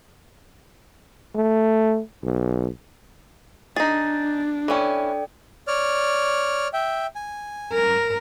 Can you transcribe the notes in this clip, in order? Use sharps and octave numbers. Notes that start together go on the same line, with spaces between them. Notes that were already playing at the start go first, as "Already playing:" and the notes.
A3
B1
D4 D#4 G#4 A6
E3 C#4 A4 D5 G5
C#5 D5 F6
E5 G5
G#5
A#4